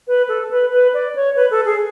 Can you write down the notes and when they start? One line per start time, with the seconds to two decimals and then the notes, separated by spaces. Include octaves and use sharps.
0.08 B4
0.29 A4
0.51 B4
0.72 B4
0.94 D5
1.16 C#5
1.36 B4
1.51 A4
1.65 G#4